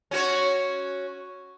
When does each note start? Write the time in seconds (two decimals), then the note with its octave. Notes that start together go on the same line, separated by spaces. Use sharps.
0.11 C#4 F#4 C#5